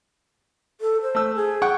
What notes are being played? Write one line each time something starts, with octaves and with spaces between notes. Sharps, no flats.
A4
C5
A3 E6
G#4
F#5 G5 C#6